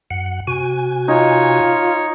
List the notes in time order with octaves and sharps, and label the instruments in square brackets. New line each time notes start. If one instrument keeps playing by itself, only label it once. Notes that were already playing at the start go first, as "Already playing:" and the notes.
[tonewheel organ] F#2 F#5
C3 F#4 G#5
[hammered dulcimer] D#4 [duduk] F4 [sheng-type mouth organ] C#5